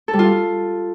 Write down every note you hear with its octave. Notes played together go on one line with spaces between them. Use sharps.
A4
G3
F4